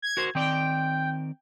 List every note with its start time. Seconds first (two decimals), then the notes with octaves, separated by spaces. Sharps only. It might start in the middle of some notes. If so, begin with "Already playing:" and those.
0.02 G#6
0.17 F#4 A#4 C5
0.35 D#3 C4 D5 G5